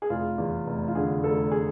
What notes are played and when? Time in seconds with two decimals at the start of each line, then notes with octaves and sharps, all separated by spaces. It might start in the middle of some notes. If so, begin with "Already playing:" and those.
0.02 G#4
0.09 F1 F4
0.38 E2
0.66 F1
0.88 F4
0.95 D3 G#4
1.23 F1 A4
1.51 G#4